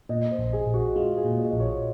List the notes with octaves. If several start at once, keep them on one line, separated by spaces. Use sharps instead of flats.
A#2 D#5
C5
A#1
G#4
A#1
F#4
G#3 F4
G#4
A#2
D#5
A#1
C#5